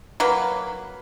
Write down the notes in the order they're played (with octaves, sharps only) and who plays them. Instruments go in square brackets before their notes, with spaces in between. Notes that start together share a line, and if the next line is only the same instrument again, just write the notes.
[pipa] F#3 A#3 B4